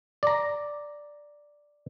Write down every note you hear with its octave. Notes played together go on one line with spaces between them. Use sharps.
D5 A#5